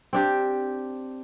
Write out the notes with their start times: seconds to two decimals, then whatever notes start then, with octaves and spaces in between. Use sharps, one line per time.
0.13 C4 D4 G4